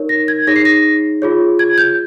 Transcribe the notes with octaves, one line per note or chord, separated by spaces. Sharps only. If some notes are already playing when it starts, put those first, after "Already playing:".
Already playing: D#4 A#4 C#5
A#6
G#6
D#4 G#4 C#5 A#6
C7
A#6
F4 G#4 C#5
G#6
G6